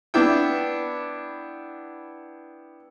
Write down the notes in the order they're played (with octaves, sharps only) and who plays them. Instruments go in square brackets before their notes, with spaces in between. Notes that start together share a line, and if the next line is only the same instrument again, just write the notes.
[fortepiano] B3 D4 E4 G5